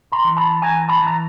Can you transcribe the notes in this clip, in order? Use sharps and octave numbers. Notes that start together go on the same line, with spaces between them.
A#5 C6
E3
A5 B5
E3 G#5 A#5
A5 B5
E3
A#5